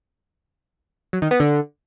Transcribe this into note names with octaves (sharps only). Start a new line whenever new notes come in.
F#3
D#3
B3
D3